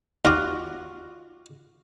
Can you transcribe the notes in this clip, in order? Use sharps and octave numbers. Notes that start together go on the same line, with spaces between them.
D#2 F4 F#4 D6